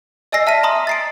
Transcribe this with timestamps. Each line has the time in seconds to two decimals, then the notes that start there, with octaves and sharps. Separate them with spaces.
0.32 D5 D#5 G#5 E6 A#6 C7
0.47 E5 A5 F6 B6 D#7
0.63 A#5 C6 D#6
0.87 A6 C7 D7